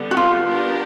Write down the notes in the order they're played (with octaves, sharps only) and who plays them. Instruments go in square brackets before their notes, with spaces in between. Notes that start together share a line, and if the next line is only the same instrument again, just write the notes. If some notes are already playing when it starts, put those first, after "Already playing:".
Already playing: [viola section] D3 G3 B3
[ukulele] F#4
F4
[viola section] B3 D4 G4 A#4